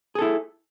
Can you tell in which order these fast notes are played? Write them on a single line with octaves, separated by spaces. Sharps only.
G#4 A4 E4